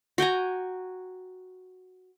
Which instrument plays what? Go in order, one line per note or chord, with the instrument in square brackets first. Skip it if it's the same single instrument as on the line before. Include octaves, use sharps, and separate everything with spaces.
[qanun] F#4 G5 G#5 A#5